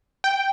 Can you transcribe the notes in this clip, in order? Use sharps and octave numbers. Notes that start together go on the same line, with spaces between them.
G5